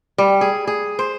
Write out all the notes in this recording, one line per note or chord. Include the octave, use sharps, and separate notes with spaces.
G3
G#4
G#4
C5